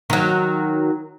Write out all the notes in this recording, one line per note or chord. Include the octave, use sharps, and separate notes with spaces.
D#3 F#3